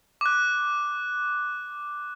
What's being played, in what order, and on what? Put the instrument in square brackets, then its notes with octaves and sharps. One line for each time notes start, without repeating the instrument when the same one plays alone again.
[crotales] D6 F#6